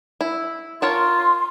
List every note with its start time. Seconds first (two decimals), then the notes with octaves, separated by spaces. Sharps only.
0.21 E4
0.82 F4 A#4 C#5 A5 C6